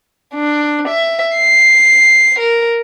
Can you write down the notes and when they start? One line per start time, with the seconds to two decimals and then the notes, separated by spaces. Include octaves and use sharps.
0.35 D4
0.88 E5
1.36 C7
2.39 A#4